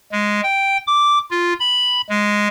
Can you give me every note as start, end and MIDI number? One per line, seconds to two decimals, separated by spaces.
0.12 0.41 56
0.43 0.77 79
0.87 1.18 86
1.30 1.53 65
1.60 2.01 83
2.09 2.48 56